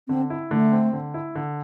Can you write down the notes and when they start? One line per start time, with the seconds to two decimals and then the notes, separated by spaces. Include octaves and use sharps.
0.08 D3 C4
0.30 E4
0.51 D3 A3
0.72 C4
0.93 D3
1.14 E4
1.35 D3